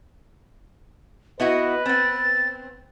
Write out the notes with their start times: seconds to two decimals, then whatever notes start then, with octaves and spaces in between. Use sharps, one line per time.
1.40 B3 E4 F#4 B4 D#5
1.86 B3 C4 A6